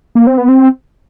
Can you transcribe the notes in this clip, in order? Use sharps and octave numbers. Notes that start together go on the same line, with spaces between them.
A#3
C4
B3
C4